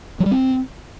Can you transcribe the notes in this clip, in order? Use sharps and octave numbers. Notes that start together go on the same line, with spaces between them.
F#3
G3
C4